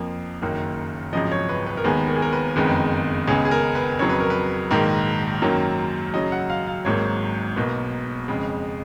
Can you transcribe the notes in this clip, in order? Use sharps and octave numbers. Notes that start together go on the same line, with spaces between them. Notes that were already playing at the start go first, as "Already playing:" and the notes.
Already playing: F2 F3 A#3
F#1 F#2 D#3 A#3
G#1 F#2 C#3 F3 D#5
C#5
B4
B4
A#4
D#2 D#3 G#3 B3 G#4
A#4
G#4
A#4
B4
F#1 F2 D#3 G#3 B3
C#2 C#3 G#3 B3 G#4
G#4
A#4
B4
F2 C#3 F#3 C#5
B4
A#4
B4
A#1 G#2 D#3 A#3
F#2 D#3 F#3 A#3
F#2 C#3 F#3 D#5
F#5
F5
F5
G#1 G#2 F#3 A#3 C#5
B1 B2 A#3 B4
F2 C#3 G#3